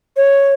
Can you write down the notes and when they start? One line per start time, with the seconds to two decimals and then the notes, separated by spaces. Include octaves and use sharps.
0.17 C#5